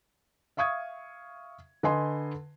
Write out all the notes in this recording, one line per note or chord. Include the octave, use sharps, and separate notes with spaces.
E5 F5 C#6 D#6 G#6
D3 B4 D#5 G#5 C6